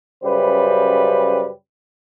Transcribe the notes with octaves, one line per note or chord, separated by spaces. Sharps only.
F#2 C#3 G3 B4 C5